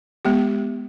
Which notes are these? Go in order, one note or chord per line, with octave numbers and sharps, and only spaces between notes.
G#3 B3 G4